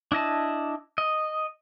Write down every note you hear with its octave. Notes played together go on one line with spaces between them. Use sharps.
D4 E4 D#5 A5
D#5